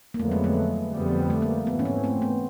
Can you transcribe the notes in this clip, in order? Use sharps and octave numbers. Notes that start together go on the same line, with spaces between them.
A#3
F2 D3 F#3 A3 B3
G#3
A3
F2 D3 G3 B3
A3
A#3
G#2 E3 A3 B3
C#4
C4
C4
B3